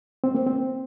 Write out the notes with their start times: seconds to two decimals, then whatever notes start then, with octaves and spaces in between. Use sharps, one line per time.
0.24 C4
0.35 A#3
0.47 C4